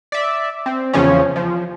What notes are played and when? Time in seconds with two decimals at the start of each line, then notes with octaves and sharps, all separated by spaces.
0.12 D5 E5
0.66 C4
0.93 E2 C#3 F3 C#4
1.36 F3